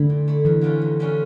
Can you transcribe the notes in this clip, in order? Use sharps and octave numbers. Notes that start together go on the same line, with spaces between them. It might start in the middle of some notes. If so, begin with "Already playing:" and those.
Already playing: D3 E4
A#2
A3 E4
F2 E3
D3 G3 C#4 F4
F2
D3 G3 C#4 F4